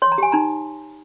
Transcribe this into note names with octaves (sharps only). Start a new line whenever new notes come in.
C#5 C6
A#5
G4 G#5
D#4 A#5